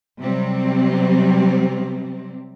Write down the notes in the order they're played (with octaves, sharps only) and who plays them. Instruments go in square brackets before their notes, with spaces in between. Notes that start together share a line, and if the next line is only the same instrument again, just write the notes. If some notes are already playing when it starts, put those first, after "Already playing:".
[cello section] C3 F#3 G3 C4